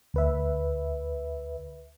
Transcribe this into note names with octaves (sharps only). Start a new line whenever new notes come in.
D2 B4 E5